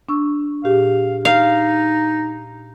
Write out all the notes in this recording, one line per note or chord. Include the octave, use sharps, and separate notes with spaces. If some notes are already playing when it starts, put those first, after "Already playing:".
D4 C#6 E6
A#2 G4 G#4 F5
D#4 F5